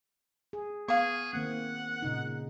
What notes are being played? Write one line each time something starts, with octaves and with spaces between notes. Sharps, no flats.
G#4
B3 G#4 F5 C#6
D#3 A#3 C4 F#5
A#2 C#3 D#4